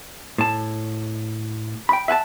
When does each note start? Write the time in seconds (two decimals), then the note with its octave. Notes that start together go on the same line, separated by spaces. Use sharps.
0.38 A2 A5
1.89 G5 B5
2.08 E5 F#5 G#5 A5